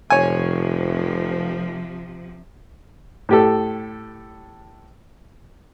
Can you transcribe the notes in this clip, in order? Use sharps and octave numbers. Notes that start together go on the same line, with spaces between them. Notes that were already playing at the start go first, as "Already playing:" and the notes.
F1 C3 F3 C#5 G#5
A2 G4 A4